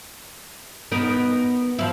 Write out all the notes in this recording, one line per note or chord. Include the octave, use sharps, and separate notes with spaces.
B3 D#4 A#4
F3 E4